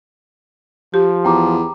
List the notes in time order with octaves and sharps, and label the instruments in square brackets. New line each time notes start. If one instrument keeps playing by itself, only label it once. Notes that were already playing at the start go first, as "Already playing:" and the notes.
[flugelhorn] F3 [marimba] G4
[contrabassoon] E2 [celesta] G5 A#5 D6